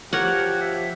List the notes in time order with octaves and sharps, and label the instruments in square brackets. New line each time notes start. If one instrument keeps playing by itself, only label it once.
[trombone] F3 [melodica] F#4 C#5 [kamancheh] G4 [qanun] A#4 D5 F#5
[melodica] E5